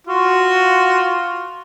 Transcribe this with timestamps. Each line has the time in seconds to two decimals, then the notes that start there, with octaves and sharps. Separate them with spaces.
0.07 F4 F#4